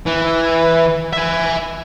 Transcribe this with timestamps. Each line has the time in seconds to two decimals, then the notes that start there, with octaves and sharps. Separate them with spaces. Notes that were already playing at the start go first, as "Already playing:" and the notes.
0.06 E3
1.13 E5 G#5